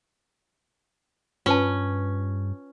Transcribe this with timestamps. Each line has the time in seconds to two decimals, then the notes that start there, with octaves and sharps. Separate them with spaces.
1.46 G2 C#4 F4 B4 A5